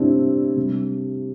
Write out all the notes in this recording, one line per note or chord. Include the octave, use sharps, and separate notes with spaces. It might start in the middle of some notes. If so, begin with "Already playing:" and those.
Already playing: C3 G3 C4 D4 E4
C3 G3